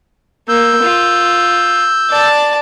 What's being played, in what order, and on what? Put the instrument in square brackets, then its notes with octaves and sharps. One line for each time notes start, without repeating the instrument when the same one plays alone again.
[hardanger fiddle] A#3 [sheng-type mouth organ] E6 G6
[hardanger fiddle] F4
D5 A5